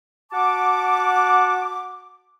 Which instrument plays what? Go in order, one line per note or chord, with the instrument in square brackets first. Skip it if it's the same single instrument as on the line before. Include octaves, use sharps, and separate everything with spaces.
[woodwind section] F#4 F#5 A5 D6